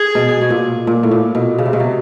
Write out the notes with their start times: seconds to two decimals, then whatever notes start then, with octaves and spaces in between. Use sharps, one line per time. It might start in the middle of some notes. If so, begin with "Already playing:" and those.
Already playing: G#4
0.15 B2
0.41 B2
0.50 A#2
0.87 A#2
1.03 A2
1.11 A#2
1.35 B2
1.58 C#3
1.66 C3
1.73 B2
1.80 C3